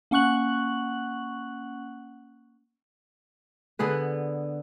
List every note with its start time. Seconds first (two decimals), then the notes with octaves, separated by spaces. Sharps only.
0.11 A#3 C#4 F#5 C#6 F#6 F#7
3.79 D3 B3 G#4 B4